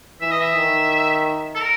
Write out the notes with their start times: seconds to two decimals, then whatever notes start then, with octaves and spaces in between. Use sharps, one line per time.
0.21 E3 E5
0.31 D#5
0.41 E5
0.56 D#3
1.55 A4
1.60 A#4